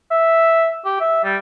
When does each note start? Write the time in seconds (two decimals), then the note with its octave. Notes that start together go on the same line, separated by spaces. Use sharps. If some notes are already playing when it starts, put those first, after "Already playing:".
0.11 E5
0.85 G4
1.00 E5
1.24 G3